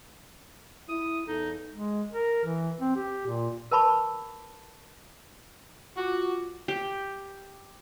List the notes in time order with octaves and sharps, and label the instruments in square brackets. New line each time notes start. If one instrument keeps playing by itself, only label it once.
[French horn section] E4 [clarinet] D#6
[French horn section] E2 A4 [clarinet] D#4
[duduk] G#3
A#4
E3
C4
G4
A#2
[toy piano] A#4 B4 A5 B5 C#6
[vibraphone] F4 D6 [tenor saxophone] F#4
[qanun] G4